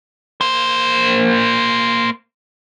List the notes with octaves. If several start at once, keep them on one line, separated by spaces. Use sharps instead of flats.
A#3 C5